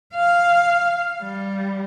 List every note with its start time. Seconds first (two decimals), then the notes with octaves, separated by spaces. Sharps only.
0.14 F5
1.21 G3